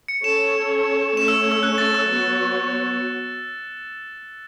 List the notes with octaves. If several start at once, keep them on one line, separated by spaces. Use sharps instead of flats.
C#7
C#4 A4 C#5 E7
A3 C#4 A4 C#5 E7
E6
E6
F#6
A6
E6
F#3 B3 F#4 C#5